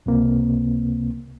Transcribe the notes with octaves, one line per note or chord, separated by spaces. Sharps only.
C#2 C3 A#3 C4